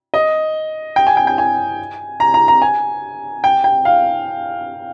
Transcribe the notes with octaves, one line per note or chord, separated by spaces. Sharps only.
D#5
G5
G#5
G5
G5
G#5
A#5
A#5
A#5
G#5
G5
G5
F5